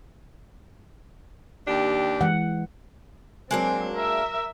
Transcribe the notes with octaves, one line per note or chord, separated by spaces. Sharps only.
D#2 D4 G4
E3 G#3 F#5
F#3 G#3 A#3 C4 D4
A#4 E5